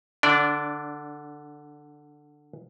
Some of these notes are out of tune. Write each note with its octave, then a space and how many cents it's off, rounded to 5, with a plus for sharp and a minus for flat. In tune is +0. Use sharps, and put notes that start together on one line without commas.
D3 +10 D4 -20 D5 -5